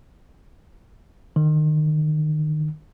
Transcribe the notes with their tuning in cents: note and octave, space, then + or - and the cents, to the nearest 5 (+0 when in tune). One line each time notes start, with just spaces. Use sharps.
D#3 -25